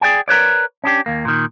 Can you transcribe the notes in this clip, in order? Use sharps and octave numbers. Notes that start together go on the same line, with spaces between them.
G#4 C5 D5 G5 G#5
A#4 B4 C#5 D5
C#4 D4 G4
D#2 A#3
A#2 D#3